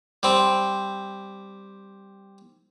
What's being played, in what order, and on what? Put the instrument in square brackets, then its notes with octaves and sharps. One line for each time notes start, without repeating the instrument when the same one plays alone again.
[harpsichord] G3 C4